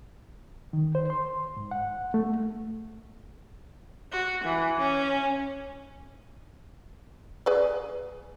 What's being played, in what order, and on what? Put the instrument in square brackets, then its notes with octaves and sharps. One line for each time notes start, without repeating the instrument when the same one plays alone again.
[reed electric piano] D#3
C5
C6
G#2
F#5
A3
[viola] F#4
E3
C#4
[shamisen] G#4 B4 D5